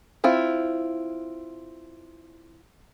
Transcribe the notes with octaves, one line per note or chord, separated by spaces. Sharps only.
C4 E4 F4